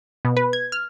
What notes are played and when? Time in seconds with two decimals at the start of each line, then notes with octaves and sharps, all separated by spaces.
0.25 B2
0.37 B4
0.53 G#6
0.72 F6